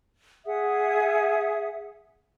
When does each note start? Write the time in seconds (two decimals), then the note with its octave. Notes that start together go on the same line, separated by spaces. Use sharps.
0.45 G#4 E5 F#5 D#6